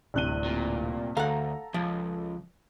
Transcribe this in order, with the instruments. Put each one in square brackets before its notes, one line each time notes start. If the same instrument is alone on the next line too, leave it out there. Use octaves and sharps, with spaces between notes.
[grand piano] D1 F#6 G7 [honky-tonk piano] G2 C3 D#7
[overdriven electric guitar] A#2
[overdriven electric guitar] D2 [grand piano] A4 [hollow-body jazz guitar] F5 F#5 [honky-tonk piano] A#5
[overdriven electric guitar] C#2 [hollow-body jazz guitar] F3